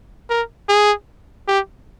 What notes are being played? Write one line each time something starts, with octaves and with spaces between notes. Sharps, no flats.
A#4
G#4
G4